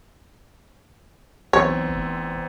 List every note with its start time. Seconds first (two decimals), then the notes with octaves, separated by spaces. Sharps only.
1.53 B1 E2 C4 C#5
1.94 F1